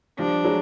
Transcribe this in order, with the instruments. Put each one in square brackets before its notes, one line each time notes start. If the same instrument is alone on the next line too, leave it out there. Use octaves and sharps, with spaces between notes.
[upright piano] F3 G3 [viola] D4
[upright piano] F#3 G#3